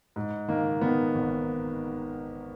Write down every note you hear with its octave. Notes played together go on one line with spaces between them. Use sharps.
G#2
D#3 A#3
D#3 B3
G#1